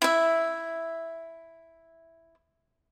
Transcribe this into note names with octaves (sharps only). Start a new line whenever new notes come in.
E4 E5